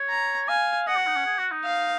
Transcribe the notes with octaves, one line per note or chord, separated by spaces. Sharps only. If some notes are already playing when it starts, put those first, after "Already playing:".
Already playing: C#5
A#5
F5 G#5
D#5 F#5
F#4
D#4
C#4
G#4
F#4
D#4
F5